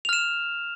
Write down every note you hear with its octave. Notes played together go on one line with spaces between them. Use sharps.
F6 E7 F7